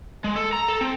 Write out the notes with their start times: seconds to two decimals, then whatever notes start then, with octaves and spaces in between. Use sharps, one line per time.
0.24 G#3
0.36 A4
0.53 A#5
0.68 A4
0.81 C4